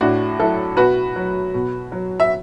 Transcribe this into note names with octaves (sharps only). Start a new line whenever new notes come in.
A2 D4 F#4
F#3 E4 A4
B2 F#4 B4
F#3
B2
F#3
E5